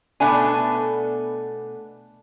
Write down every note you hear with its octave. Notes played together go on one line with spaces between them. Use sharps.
B2 A3 B3 D4 D5 G#5